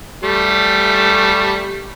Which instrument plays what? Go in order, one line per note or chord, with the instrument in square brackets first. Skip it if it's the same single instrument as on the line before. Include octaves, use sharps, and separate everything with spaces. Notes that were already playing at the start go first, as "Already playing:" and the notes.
[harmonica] G3 A3